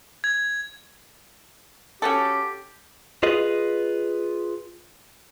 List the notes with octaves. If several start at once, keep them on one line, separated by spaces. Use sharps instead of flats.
G#6
C#4 F#4 G4 A4
F4 G#4 B4 D#5